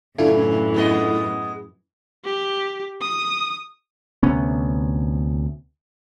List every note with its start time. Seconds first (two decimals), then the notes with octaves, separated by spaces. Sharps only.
0.18 F#2 A2 C#3 E3 D4 E4 F4 A4
0.74 G#3 B3 D#5
2.25 G4
3.01 D#6
4.23 D2 C3 B3 C#4